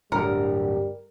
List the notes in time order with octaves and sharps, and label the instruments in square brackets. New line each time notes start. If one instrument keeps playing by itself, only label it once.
[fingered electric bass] D1 D3 [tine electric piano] G2 [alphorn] G3 [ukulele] A#4